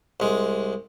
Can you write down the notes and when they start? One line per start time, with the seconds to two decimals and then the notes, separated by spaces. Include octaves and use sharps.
0.20 C2 G#3